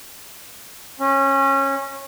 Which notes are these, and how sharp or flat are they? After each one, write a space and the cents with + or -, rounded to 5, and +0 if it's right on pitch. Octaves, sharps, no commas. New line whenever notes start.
C#4 -20